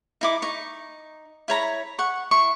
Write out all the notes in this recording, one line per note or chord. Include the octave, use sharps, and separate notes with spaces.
D#4 E4 D6
D#4 C#6
E4 C#5 A#5 B5
F#5 C#6
E4 C6 C#6